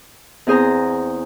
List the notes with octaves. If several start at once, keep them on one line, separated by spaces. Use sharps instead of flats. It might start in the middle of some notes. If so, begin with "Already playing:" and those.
E2 C4 G#4 C5 A#5